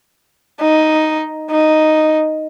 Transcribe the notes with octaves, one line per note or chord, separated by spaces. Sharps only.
D#4
D#4